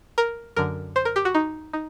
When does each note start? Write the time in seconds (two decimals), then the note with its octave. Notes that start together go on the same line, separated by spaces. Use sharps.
0.18 A#4
0.56 F#2 D3 A#4
0.96 C5
1.05 A#4
1.16 G4
1.25 F#4
1.35 D#4
1.73 D#4